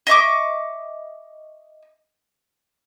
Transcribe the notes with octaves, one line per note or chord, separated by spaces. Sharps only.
D#5 E5 C#6 D6